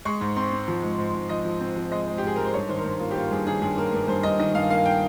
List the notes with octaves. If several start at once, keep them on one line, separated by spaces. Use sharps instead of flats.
G#3 C#6
G#2
C4 C6
C4
F3
G#2
G#2
G#2
F3 D#5
F3
C4
F3
G#3 D#5
G#3
G4
G#2 G#4
G#2 A#4
C5
G2 C#5
D#3 C5
A#4
G2 C5
A#3 F4
G4
A#3 F4
G2 G#4
D#3 G#4
G2 G#4
A#3 A#4
G2 A#4
G2 C5
G2 D#5
D#3 D#5
G2 F5
A#3 F5
G5